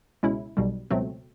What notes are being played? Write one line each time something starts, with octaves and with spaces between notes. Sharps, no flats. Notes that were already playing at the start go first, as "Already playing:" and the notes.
C#2 B2 G#3 C#4 E4
B1 B2 G3
C#2 B2 F#3 A3 C4